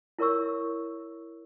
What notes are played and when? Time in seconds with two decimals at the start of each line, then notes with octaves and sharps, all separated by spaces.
0.19 E4 A#4 C#5 C#6 E6